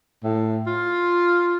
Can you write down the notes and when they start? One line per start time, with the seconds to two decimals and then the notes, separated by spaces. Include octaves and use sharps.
0.23 A2
0.67 F4